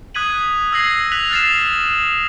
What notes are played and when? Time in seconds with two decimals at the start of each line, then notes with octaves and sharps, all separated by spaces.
0.15 D#6 F#6 G#6 B6 D#7 F#7
0.72 E6 G#6 A#6 C7 F#7
1.12 F#6 B6 F7 F#7
1.31 F6 A6 C7 E7